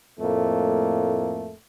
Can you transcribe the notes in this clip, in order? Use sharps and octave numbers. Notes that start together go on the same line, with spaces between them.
F2 A2 A3 A#3